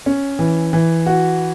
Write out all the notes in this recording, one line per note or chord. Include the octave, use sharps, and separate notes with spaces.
C#4
E3
E3
F#4